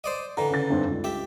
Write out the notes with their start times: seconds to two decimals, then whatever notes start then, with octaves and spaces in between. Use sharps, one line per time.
0.04 C5 D5 D#5
0.37 D3 E3 A#5
0.51 C#3 A6
0.70 G2 C4 D#4
0.88 C#2
1.04 G4 E5